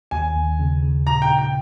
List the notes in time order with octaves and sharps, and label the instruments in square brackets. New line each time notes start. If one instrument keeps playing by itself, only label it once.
[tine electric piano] D#2 [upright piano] G#5
[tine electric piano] D#2
C#3
C#3
[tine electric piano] A#2 [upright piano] A#5
[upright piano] G5
[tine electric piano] D#4
[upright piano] G5